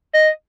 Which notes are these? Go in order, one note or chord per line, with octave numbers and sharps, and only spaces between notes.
D#5